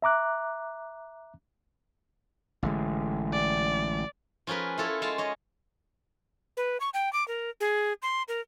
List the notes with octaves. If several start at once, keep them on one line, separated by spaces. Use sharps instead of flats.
E5 A#5 D6 F#6
A1 D3 G#3
D5
F3 C#4 G#4 A#4 B4
E4 F4 A4 C#5
G#3 F4 F5 A5
C#5 D#5
B4
C#6
G5
D6
A#4
G#4
C6
A#4